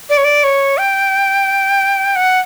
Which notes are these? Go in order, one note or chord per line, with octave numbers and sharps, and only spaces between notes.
D5
C#5
D5
C#5
G5
F#5